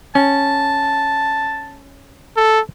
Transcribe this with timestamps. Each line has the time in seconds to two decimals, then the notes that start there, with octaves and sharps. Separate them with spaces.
0.15 C#4 A5
2.37 A4